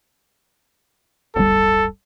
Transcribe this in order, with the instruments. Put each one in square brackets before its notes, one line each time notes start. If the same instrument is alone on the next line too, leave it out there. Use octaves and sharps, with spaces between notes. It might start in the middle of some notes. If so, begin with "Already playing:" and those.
[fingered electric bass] D1 G1 G3 [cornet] A4